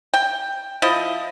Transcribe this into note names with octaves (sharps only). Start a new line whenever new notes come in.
G5
F3 E4 D#5